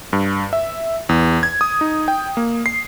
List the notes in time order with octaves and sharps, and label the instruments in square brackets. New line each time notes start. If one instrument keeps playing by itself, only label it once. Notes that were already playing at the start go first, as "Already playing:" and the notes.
[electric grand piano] G2
E5
E2
G#6
D#6
D#4
G5
A#3
C7